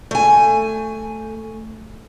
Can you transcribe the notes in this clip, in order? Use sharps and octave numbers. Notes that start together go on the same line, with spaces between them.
A3 G#5